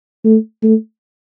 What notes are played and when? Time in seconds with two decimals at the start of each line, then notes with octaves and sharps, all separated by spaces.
0.25 A3
0.63 A3